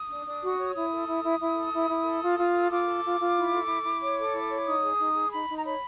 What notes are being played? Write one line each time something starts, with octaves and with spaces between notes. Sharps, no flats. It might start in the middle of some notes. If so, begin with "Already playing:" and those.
Already playing: D#6
D4
D4
F#4
C#5
E4 D#6
A4
E4
E4
E4
A4
E4
E4
A4
F4
F4
A4
F4 D6
A4
F4
F4
E4
A4
E4
E4
C#5
A4
E4
C#5
D#4 D#6
G#4
D#4
G#4
D#4 B5
D#4
A#5
C#5 B5